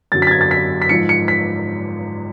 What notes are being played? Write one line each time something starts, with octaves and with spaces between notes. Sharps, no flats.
F#2 D3 F#3 A6
A6 B6
G#6
A6
B6
B6
G#2 F3 C#7
C#7
B6